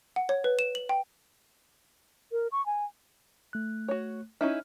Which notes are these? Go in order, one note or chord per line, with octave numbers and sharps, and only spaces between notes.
F#5
C#5
B4
E7
F#7
G5
A#4
C#6
G#5
A3 F#6
F#4 C#5
C#4 D#4 E4 F6